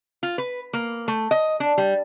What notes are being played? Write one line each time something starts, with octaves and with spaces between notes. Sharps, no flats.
F4
B4
A#3
A3
D#5
D4
G3